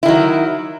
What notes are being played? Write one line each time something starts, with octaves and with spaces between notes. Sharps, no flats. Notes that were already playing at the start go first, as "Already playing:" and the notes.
D#3 F#3 E4